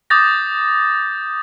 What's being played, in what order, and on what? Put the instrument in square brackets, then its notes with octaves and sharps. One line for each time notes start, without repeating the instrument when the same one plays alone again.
[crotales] D6 D#6 G6 A6 A#6